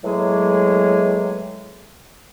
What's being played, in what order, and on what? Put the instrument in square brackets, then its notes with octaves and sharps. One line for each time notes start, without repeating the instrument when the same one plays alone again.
[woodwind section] A2 E3 F#3 G#3 A#3 G#4